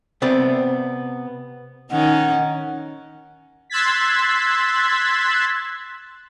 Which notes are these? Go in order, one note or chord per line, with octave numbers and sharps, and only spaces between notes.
C3 B3 C4 D5
D#3 C#4 D#4 F#5
C6 E6 F#6 G#6 A6 B6